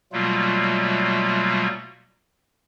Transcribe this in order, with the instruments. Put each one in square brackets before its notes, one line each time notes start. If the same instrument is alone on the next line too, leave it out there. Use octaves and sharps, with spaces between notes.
[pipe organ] B2 F#3 G3 A3 A#3 F4